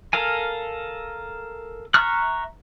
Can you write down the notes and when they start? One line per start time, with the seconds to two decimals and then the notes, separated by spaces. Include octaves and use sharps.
0.13 A4 A#4 F5 G#5
1.94 E5 A#5 C#6 F6 F#6